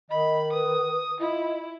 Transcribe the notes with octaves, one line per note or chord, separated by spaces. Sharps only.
D#3 D#5 B5
B4 D#6
E4 F4 D#5